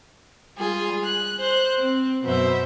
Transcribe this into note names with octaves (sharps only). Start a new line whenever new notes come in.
G3 F4 G#4
F#6
C5 F#6
C4
F#2 B2 C5 E5